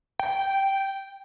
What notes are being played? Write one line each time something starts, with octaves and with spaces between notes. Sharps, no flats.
G5